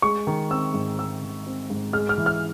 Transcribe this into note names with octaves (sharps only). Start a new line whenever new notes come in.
G#3 C#6
D#3
C4 E6
G#2
G#3 E6
D#3
C4
G#2
G#3 F6
F6
E3
F6